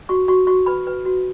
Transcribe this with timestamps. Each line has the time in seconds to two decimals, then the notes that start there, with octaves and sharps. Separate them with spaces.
0.09 F#4 C#6
0.28 F#4 C#6
0.47 F#4 C#6
0.66 B4 B5
0.87 B4
1.06 F#4